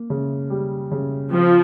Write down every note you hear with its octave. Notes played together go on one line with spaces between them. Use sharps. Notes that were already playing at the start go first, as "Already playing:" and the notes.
Already playing: A#3
C#3
G3
C#3
F3 C4